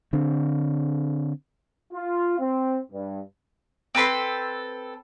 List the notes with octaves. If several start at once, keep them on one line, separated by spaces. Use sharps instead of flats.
D3 C4 D4
F4
C4
G2
C4 A4 B4 C6